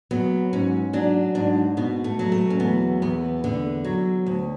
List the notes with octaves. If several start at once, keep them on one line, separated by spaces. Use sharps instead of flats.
F#3 B3
G#2 C#4
F#3 D4
G#2 D4
B2 B3
A3
F#3
A3
C#4
E2 B3
E2 B3
D3 B3
F#3
D2